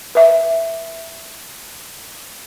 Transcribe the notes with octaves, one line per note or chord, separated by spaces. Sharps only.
B4 E5